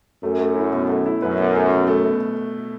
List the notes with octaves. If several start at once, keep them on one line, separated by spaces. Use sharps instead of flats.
F#2 A3
A3
E4
B2
A3
E4
F#2 B4
B2
A3
B2
A3
B2